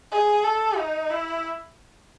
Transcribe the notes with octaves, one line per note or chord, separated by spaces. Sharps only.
G#4
A4
D#4
E4